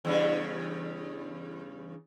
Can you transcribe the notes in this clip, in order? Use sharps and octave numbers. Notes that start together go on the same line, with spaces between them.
E2 G2 C#3